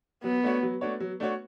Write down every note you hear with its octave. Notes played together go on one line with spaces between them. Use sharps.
F#3 B3
A3 D4 F#4 C#5
F#3
A3 D4 F#4 C#5
F#3
A3 D4 F#4 C#5